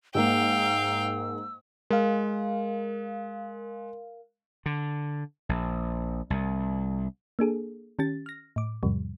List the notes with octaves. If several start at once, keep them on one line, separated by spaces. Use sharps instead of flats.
G#2 A#3 F5 G5 E6
G#3 A#4 F5
D3
A#1
C2
A#3 D4 G#4 A4
D#3 C#4 G4 A6
F6 A#6
A2 D6
E2 G#2 C3 F3 G3